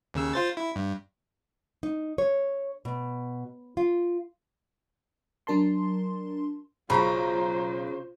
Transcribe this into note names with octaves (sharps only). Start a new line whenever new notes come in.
D#2 C#3 E6
F4 C5 A6
E4
G2
D#4
C#5
B2
F4
F#3 D4 A#4 A5 C6
B1 C#3 F4 C5 A#5 B5